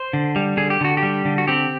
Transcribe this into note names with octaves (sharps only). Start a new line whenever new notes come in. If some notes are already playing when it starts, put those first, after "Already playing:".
Already playing: C5
D3
G3
D3 G#4
G4
D3 F#4
G4
G3
D3
F#4
C4 G4